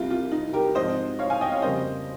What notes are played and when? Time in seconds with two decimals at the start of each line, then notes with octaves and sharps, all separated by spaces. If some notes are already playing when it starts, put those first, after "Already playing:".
Already playing: C2 C3 G3 F4
0.10 F4
0.32 D#4
0.53 G4 A#4
0.75 G#2 F3 C4 C5 D#5
1.19 C#5 F5
1.30 F5 G#5
1.41 D#5 G5
1.52 C#5 F5
1.62 F2 C#3 G3 A#3 C5 D#5